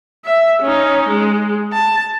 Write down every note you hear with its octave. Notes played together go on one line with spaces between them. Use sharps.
E5
C#4 D#4
G#3
A5